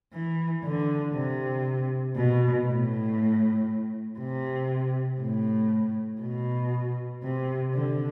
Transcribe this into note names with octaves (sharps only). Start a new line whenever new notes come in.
E3
D3
C3
B2
A2
C3
A2
B2
C3
D3